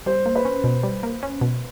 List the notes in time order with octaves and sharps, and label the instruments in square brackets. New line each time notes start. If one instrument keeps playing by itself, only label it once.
[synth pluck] G3 [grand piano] C5
[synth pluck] A#3
[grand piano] B4
[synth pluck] C#4
B2
G3
A#3
C#4
B2